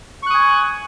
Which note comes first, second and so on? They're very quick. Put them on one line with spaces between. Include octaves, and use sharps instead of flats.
C#6 F#6 D#6 G#5